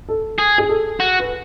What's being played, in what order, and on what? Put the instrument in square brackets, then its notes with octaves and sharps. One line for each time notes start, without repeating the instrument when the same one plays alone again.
[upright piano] A4
[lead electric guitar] G#4
[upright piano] G#4
A4
[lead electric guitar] F#4
[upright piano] B4